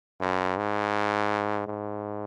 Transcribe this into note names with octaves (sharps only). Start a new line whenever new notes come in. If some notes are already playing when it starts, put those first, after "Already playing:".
F#2
G#2
G#2